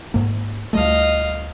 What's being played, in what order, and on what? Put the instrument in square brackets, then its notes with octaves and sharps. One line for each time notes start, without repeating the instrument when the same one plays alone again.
[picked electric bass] G#2 A#3
[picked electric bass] D2 G3 A3 [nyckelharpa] D#5 F5